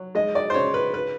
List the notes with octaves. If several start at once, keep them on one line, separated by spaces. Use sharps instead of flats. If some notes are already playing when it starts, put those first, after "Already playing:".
Already playing: F#3
G#3 D#5
D5
C5
C#3 C#5
B4
B4